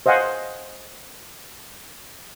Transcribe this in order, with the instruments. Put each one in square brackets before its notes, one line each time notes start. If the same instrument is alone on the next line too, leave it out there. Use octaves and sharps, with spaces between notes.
[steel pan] C5 D#5 F5 F#5 G#5